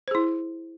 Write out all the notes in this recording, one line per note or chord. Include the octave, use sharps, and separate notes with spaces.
E4 G#4 C5